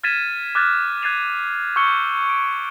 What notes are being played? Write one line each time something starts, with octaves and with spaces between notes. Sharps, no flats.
F6 G#6 A6 B6 D#7 E7
D6 F6 F#6 G#6 A6
F#6 G#6 A6 C7 D#7 F7
C#6 E6 G6 C#7 G7
D7